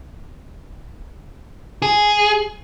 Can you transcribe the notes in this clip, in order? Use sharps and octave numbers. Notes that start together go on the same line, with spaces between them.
G#4